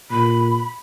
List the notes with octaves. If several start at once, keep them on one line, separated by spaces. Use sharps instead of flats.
A#2 B5